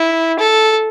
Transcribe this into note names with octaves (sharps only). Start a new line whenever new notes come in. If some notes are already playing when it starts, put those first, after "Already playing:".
Already playing: E4
A4